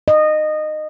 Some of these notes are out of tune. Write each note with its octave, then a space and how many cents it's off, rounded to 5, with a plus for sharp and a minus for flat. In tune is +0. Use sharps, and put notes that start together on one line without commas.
D#5 -20